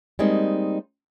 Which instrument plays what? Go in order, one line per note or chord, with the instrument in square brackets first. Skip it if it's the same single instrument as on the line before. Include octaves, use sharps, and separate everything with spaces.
[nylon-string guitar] G3 G#3 A#3 C4 D#4